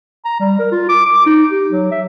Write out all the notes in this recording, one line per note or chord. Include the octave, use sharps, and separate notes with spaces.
A#5
G3
A#4
F4
D6
D6
D#4
G4
F#3
E5